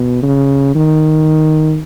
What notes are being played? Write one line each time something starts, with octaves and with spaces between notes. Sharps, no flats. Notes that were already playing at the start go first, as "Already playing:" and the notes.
Already playing: B2
C#3
D#3